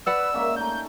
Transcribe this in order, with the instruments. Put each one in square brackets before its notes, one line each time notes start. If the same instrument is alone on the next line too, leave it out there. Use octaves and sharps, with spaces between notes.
[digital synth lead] B4 [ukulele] D5 F#5 [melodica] E6
[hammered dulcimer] G#3 A#3 C#4 [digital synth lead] E5
[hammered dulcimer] A3 D#4 [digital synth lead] G6